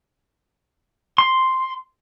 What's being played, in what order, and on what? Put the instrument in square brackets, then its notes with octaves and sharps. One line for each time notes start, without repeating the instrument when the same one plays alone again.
[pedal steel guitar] C6